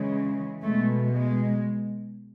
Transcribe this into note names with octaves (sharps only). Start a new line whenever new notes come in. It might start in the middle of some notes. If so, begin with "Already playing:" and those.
Already playing: C#3 E3 G#3
B2 G#3 A3
G#3